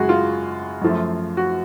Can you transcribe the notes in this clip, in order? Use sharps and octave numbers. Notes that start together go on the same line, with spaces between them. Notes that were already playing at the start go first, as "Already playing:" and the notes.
Already playing: F#2 C#3 G#3 F#4 G#4
F4
F#2 F3 A3
F#4